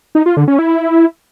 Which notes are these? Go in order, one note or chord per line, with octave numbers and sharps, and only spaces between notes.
D#4
F4
D3
C#4
E4